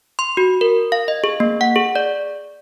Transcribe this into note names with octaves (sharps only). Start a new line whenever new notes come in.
C6
F#4
A#4
F5
D#5
G#4
A#3
F#5
G#4
D5